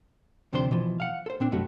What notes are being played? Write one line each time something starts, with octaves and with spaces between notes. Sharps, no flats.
D2 C3 F3 D4 C5 C6
B2 E3 F3
F5 F#5
A4 C5
A#2 C4 D4
C2 F#2 G3 A3 F#4